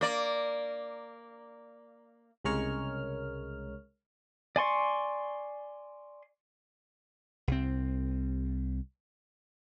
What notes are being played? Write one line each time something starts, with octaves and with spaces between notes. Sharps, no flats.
A#3 D5
C2 C#3 G#3 A#4 C#5 F6
D5 G#5 C6 C#6
C2 C4